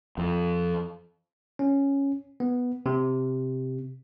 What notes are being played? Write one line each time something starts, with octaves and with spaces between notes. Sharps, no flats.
F2
C#4
B3
C3